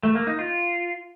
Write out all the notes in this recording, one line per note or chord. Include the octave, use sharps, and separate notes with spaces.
A3
A#3
D#4
F4